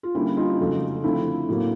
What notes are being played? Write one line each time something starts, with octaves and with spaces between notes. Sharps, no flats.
F4
D3 G3 A#3 C#4 E4
D#4 F4
F2 C#3 F#3 A3 C#4
D3 F3 A3 C4 E4
A2 F#3 A#3